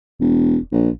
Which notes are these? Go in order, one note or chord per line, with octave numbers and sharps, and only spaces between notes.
E1
A#1